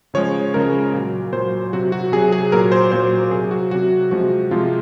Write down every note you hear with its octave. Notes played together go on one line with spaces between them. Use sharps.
C#3 F3 G#3 C#5
C#3 F3 G#3 A#4
A#2 F#3
A#2 F#3 C5
C3 F#3 F#4
F#4
C3 F#3 G#4
G#4
A#2 F#3 A#4
C5
A#2 F#3 C5
C3 F#3 G#4
F#4
C3 F#3 F#4
C3 F3 G#3 F#4
C3 F3 G#3 F4